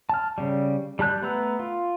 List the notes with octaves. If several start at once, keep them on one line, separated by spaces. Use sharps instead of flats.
A5 F6
C#3 G3
G3 G4 A5 F#6 G6
A3 B3 B4 A#5 E6
F4